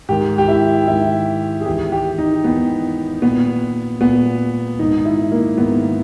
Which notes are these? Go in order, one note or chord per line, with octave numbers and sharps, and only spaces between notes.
G#2 D#3 G4
G4
E4
G#2 D#3 E4
G#4
E2 D#3 G4
G4
D#4
E2 D#3 B3
A#2 B3
A#2 B3
G#2 D#3 D#4
E4
A#3
G#2 D#3 B3